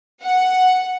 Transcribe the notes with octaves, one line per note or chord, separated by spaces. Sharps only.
F#5